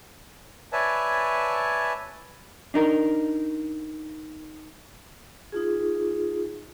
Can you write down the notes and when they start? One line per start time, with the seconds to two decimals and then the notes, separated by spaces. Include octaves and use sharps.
0.72 B4 C#5 D5 E5 G#5 A5
2.74 D4 D#4 A#4
5.52 D#4 F4 G#4